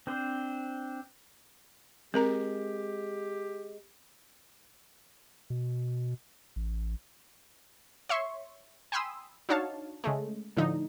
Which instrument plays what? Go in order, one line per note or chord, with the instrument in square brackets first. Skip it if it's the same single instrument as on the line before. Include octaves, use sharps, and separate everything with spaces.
[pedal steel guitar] C4 D4 C5
[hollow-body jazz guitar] G#3 [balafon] C4 A#4 A#5 [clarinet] G4
[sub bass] B2
A1
[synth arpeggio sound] C#5 E5 C6 C#6
G5 G#5 B5 C6 D#6 E6
D4 D#4 F#4 C#5 F5 A5
C#3 G#3 A3
A2 D3 F3 D#4